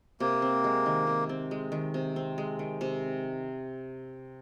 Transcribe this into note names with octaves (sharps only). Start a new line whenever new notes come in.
C3 A#3
C4
G#3
D#3
C3
C4
G#3
D#3
C3
C4
G#3
D#3
C3